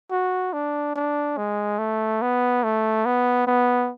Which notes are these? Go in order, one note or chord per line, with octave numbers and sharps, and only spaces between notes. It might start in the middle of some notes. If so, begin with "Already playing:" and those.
F#4
D4
D4
G#3
A3
B3
A3
B3
B3